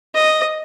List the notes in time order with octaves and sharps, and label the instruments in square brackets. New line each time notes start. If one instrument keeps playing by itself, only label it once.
[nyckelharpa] D#5